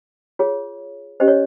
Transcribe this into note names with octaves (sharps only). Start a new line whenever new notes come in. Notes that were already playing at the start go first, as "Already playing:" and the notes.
F4 G#4 C#5
C#4 G4 C5 D#5
C#5